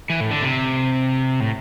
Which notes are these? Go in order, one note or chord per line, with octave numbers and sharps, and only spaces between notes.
E3
A2
D3
C3
A2